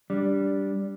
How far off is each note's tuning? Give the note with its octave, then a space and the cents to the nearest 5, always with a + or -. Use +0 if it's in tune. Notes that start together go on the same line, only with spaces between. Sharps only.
G3 +0 D4 -10